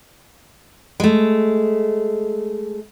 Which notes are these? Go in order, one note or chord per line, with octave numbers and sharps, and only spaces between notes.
G#3 A3